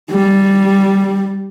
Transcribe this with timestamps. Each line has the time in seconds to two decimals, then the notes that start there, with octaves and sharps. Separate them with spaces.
0.11 G3